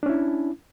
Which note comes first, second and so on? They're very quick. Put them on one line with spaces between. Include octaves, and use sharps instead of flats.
D4 C#4 E4